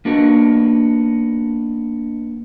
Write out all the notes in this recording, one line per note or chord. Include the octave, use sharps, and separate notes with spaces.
A#3 B3 D4 D#4 F#4 A#4